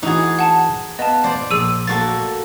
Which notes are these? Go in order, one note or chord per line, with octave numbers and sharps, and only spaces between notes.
E3 D#4 F#4 G#4
F#5 A5
B3 D#5 F5 A5
C5 D5
A#1 G#4 E6 D#7
A#3 F#4 A4 A6